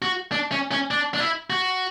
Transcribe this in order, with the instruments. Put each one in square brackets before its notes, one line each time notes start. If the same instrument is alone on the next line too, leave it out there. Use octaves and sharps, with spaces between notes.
[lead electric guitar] F#4
D4
C#4
C#4
D4
D4
E4
F#4